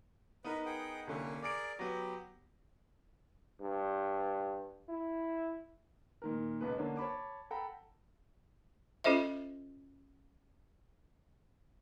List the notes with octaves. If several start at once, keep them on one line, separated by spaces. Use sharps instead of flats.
B3 D#4 A#4 B4
G#4 F#5 G5
C2 D3 A#3 C#4
G#4 A#4 D5 D6 D7
F#3 B3 G4
G2
E4
A#2 D#3 A#4
C#2 B2 B4
D3 A#3 C#4 D4
C#5 A5 B5 D6
A4 F#5 G5 A#5 B5
C#4 F4 A4 C5 D#5 E5